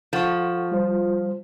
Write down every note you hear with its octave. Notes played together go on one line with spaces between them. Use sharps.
F3 A4 F#5 C#6
G3 F4 C5